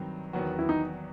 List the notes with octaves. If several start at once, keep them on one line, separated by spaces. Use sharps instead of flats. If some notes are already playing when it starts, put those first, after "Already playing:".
Already playing: G2 D#3 F#3 C4
E2 D#3 F#3 B3 F#4
E4
D#4